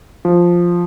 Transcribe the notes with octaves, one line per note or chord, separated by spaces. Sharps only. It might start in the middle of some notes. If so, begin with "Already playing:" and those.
F3